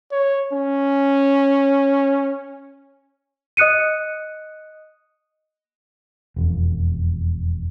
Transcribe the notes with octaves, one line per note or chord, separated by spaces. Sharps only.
C#5
C#4
D#5 D#6 F#6 C#7 D#7
E1 F2